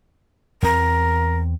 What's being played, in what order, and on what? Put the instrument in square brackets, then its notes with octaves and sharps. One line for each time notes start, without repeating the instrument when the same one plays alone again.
[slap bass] E2 C4 [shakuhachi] A#4